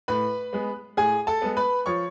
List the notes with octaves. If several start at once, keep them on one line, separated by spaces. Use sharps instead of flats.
A2 B4 B5
G#3 B3
A2 G#4 G#5
A4 A5
G#3 B3
B4 B5
F3 C#5 C#6